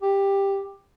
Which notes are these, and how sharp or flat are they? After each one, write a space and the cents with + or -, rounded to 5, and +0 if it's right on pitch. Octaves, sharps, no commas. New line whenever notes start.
G4 +10